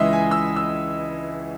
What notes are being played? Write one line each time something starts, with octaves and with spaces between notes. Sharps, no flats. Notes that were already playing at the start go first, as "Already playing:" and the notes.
Already playing: C#2 C#3 E3 G#3 D#5 E5
G#5
E6
E6